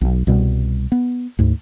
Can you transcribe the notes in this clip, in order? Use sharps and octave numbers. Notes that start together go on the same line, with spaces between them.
B1
C2 B2 G3
B3
D2 G#2